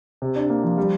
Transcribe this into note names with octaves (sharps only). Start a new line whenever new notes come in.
C3
D4
A#3
F3
G3